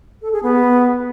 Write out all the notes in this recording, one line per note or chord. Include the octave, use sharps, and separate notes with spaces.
A4
G#4
B3